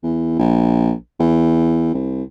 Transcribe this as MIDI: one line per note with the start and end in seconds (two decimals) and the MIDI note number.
0.03 0.39 40
0.39 0.92 34
1.20 1.90 40
1.94 2.23 36